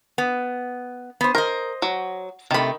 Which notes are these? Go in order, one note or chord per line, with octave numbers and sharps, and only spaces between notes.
B3
B3 C5
A#4 C5 D#5
F#3
C3 D#3 A3 B5